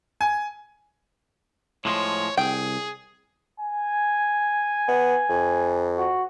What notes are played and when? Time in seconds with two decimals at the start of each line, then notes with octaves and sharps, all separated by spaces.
0.21 G#5
1.85 A2 F3 G#3 C#5
2.37 C2 G#4 G5
3.60 G#5
4.88 B3
5.29 F2
5.98 F#4